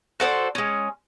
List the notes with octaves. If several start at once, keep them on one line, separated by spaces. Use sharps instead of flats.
F#4 A4 C5 D5
G#3 C#4